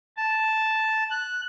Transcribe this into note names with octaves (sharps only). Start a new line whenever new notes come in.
A5
F#6